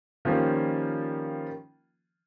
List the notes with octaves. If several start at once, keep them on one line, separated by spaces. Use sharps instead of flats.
D#3 F3 G3 A#3 C#4 F4